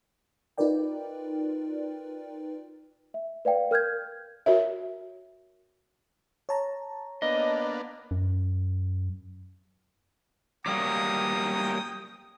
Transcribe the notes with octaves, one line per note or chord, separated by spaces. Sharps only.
D#4 F4 A#4 B4 D5 G5
E5
B4 D5 F5 G5
A#4 F6 G6 G#6
F#4 A#4 C#5 E5
C#5 A5 A#5
A#3 B3 D4 D#5
F#2
F#3 G3 A#3 G5 D#6